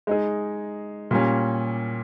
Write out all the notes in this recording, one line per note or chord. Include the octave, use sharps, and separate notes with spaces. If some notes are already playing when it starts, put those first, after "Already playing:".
G#3 D#4 G#4
A#2 G3 A#3 C#4